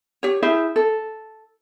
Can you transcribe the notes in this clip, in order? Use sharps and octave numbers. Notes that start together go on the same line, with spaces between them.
G4 C#5
E4 G#4 C5 E5
A4